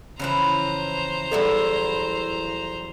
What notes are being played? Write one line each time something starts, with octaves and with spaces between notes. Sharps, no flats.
C#3 E3 F3 E4 B4 C5 A#5
E2 G2 F#3 E4 A4 B4 C#5 D5